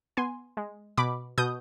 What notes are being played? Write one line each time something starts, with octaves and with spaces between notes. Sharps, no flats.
B3 G#5 C6
G#3
B2 B5 D6
B2 D#6 G6